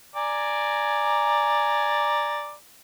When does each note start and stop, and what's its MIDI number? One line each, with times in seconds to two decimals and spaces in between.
0.16 2.54 74
0.16 2.54 80
0.16 2.54 82